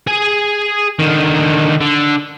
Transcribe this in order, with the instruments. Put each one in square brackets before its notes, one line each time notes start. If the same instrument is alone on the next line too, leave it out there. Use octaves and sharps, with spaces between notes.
[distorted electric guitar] G#4 G#5
D3 D#3
D3